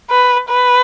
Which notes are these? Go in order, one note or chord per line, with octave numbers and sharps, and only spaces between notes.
B4
B4